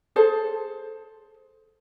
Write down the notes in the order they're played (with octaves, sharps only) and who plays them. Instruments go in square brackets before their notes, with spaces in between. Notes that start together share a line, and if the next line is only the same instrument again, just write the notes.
[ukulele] G#4 A4 C5